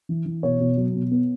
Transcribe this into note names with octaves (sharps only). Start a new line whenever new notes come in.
E3
E3
B2 C#5
B2
F#3
B2
B3